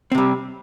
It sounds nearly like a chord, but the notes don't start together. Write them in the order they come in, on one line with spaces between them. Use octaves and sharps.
C4 C3 G3